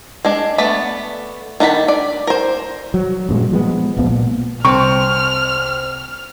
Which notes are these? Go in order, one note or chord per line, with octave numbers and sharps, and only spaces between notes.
G#3 D4
A3 B3 D5 B5
D#3 D4 F#5 A#5 B5
D5
A#4 C5
F#3
A1 G2 A#2 G#3
F3 G#3 B3
D1 A#1 F3 B3
A#2
C2 C4 C5 A5 C#6 F6